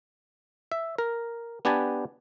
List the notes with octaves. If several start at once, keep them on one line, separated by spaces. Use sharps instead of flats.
E5
A#4
B3 D4 G4 B4 G#5 A5